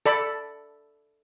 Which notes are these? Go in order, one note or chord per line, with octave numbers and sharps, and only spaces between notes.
A4 D5 B5